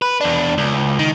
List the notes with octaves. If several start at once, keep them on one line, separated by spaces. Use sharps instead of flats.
B4
E2 D4
C#2
D#3